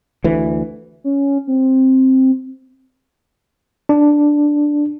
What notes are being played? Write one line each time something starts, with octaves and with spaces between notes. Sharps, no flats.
D2 E3
C#4
C4
D4